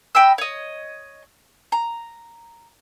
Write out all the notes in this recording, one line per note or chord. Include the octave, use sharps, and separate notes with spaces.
D#5 G5 B5 E6
C#5 D#5
A#5